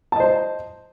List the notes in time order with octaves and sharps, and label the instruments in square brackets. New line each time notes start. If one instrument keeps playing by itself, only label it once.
[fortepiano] A5
D#5
C5